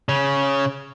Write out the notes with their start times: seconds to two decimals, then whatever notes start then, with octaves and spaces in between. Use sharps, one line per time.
0.09 C#3 C#4